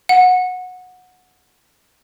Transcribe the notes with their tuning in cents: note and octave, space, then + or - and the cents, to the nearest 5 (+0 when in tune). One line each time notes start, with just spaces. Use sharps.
F#5 -15